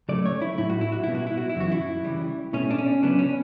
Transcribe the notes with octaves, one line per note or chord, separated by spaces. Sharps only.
C#3 F#3 A3 D5
C#5
E4
A2 F#3 A3 E4
F#4
E4
F#4
B2 G3 B3 E4
F#4
E4
F#4
E4
F#2 C#3 E3 F#4
E4
C#3 E3 G3
B2 A3 C#4
D4
C#4
C#3 F#3 B3 D4
C#4